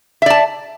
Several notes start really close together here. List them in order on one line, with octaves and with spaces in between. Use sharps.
E5 D5 A5